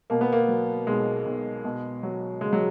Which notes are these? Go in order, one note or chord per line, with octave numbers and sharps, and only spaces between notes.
B2 A#3
B3
A#3
F#3
B1 G#3
B1
B2
F#3
C#2 G#3
F#3